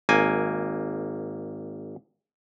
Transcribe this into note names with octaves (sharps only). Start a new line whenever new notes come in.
G#1 A#3 G#5